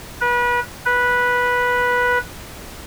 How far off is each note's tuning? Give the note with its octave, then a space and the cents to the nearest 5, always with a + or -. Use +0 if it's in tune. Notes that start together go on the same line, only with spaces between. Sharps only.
B4 -30
B4 -10